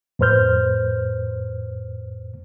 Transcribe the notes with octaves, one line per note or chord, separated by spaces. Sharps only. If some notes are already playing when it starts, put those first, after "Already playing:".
F2 A2 B4 C5 F6 G6